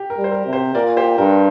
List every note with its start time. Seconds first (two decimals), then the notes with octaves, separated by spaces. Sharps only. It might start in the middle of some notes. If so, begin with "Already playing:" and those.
Already playing: G4
0.10 A#4
0.17 G3
0.24 C5
0.32 A#4
0.46 C3
0.53 G4 C5
0.75 A#2 A#4 D5
0.97 G4 C5
1.18 G2 A#4